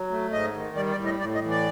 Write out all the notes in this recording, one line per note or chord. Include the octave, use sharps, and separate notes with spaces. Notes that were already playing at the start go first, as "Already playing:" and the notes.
Already playing: F#3
A3
G#2 D#5
D#3
G3 D5
D5
A2
D#5
A2 D5
D#5
E3
D5